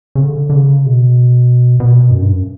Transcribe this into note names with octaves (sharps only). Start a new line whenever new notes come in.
C#3
D3
D3
C#3
B2
B2
F#2
G2
F#2